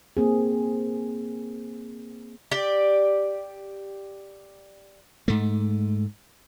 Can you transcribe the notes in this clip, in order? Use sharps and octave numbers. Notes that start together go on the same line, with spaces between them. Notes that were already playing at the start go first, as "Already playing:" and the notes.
A#3 C4 G#4
G4 D5
G#2 A3